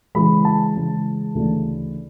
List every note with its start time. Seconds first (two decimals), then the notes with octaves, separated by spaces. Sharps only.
0.15 C#3 E3 G#3 B5
0.45 A5
0.75 C#3 E3 G#3
1.35 D2 C#3 E3 A3 D4